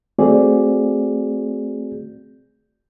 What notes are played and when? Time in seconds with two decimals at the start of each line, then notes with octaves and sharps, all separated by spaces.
0.18 A3 C4 F#4 G#4 D5